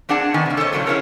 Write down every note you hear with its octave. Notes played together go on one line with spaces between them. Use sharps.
C4 D4 G#4 F#5 A5
D#3 B3 G#5
C3 A#3
A4 C5 C#5 D#5
A2 C#3 F3 F#3 G#3
C#4 E4 F4 G#4 A#4 C#5